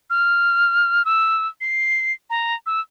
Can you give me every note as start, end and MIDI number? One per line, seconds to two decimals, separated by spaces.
0.10 1.05 89
1.05 1.47 88
1.61 2.13 96
2.30 2.55 82
2.66 2.80 88